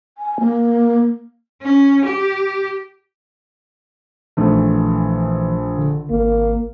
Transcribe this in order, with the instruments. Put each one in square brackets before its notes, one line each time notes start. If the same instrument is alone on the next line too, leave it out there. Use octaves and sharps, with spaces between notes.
[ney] G#5
A#3
[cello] C#4
G4
[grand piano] A#1 A3 [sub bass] E3
[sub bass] D3
[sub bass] G#1 [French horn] A#3